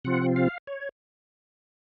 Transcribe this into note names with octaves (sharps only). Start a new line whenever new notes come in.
C3 F3 C4 F4 F#5
F5
C#5